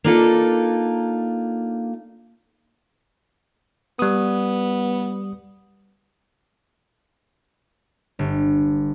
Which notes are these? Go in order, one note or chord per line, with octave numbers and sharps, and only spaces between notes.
A#3 D4 D#4 F4 A4
G3 B3 D#6
G1